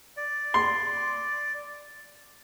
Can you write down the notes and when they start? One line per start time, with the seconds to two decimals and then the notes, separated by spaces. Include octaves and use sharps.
0.17 D5
0.54 C6